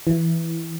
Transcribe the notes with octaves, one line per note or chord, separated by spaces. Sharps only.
E3